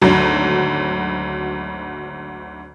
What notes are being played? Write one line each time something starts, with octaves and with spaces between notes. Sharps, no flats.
G#1 D2 F#3